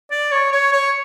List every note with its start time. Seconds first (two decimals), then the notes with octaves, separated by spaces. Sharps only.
0.11 D5
0.31 C#5
0.52 C#5
0.72 C#5